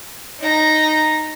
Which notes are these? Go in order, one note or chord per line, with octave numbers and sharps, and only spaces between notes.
D#4 A#5